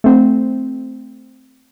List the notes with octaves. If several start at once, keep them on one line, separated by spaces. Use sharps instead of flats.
A3 C4